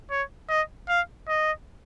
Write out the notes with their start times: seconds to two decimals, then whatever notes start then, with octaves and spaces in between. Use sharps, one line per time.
0.10 C#5
0.49 D#5
0.89 F5
1.28 D#5